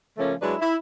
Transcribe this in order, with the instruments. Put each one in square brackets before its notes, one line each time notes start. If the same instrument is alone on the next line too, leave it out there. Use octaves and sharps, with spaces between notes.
[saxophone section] C#3 F3 A3 A#3 C#4
F#3 G#3 D4 E4 B4 D5
E4